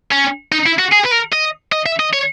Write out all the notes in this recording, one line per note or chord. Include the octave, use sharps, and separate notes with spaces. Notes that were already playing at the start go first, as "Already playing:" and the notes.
C#4
D#4
E4
F#4
G#4
B4
A#4
D#5
D#5
E5
D#5
C#5